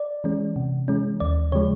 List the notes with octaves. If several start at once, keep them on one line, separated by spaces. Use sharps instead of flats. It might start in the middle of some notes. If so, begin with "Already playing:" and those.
Already playing: D5
E3 G#3 C#4
C3
E3 G#3 C#4
D#2 D5
C#3 F3 G#3 C#5